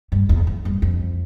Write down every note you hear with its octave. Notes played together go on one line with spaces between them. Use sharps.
G2
E2
F2
G2
F2